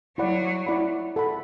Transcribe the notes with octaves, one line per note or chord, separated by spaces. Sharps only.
F#3 E4 D5 F#5 B5
E4 D5 F#5 B5
A4 F#5 B5